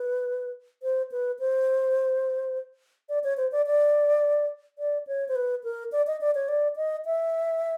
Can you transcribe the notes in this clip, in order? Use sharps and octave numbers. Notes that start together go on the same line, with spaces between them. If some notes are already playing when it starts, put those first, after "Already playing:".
Already playing: B4
C5
B4
C5
D5
C#5
C5
D5
D5
D5
C#5
C5
B4
A#4
D5
D#5
D5
C#5
D5
D#5
E5